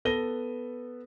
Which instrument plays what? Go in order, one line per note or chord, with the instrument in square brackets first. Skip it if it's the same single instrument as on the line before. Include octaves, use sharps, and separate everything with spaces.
[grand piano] B3 A4 B4 A#6 D#7 G7